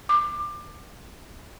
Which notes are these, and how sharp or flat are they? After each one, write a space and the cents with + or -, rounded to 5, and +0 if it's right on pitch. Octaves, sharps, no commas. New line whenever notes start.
D6 +25